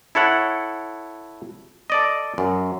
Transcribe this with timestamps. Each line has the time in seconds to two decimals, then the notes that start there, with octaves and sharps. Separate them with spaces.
0.15 E4 A4 C#5 F#5
1.90 A4 D5 D#5
2.38 F#2